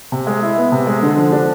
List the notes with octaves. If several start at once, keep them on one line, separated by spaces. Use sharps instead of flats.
C3
G#3
E4
B3
C3
G#3
D3
F3
D4